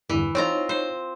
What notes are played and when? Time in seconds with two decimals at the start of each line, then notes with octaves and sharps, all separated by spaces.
0.09 E2 G2 D3 E3
0.35 C4 D#4 F4 C#5 A#5
0.69 C5